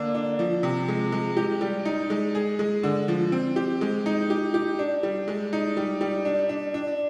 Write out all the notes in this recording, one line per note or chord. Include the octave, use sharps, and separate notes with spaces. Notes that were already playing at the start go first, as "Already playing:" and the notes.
Already playing: D3 A#3 D4
D4
F3
C3
G#3
G#3
G4
G3
D#4
G#3
G#4
G#3
D3
F3
C4
G4
G#3
D#4
G4
G4
D4
G3
G#3
D#4
G3
G3
D4
D4
D4